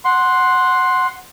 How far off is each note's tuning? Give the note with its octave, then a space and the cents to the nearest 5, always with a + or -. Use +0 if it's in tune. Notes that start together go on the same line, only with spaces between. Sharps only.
F#5 -5 C6 +5